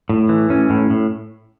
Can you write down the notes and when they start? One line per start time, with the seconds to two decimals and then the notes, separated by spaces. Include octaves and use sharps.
0.09 A2
0.29 E3
0.50 A2 C#4
0.70 A2
0.90 A2